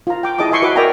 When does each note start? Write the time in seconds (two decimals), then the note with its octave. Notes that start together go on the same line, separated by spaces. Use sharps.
0.07 F4 A#5
0.23 G5 D6
0.38 E4 G#4 D#5 A5 D6
0.51 D#5 E5 G#5 C6 C#6
0.62 F#4 B4 E5 D6
0.76 A#4 D5 E5 G5 G#5 A#5